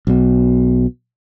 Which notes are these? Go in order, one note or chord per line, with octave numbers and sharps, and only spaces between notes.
B1 B2